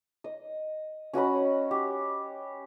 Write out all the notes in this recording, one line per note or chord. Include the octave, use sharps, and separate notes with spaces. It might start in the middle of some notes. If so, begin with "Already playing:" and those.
D#5
C#4 F#4 D#5 B5
G4